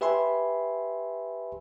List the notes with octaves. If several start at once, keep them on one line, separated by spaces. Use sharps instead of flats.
G4 B4 E5 G#5 B5 C6